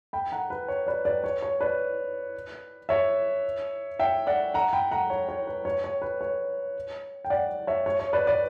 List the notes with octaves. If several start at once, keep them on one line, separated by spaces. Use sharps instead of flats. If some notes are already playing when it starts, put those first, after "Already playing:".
G5 B5
F#5 A#5
B4
C#5
B4 D5
B4 D5
C#5
C#5
B4 D5
C#5 E5
E5 G5
D5 F#5
F#5 A#5
G5 B5
F#5 A#5
C#5
C#5
B4
C#5
C#5
B4
C#5
G5
D5 F#5
C#5 E5
C#5
C#5
B4 D5
B4 D5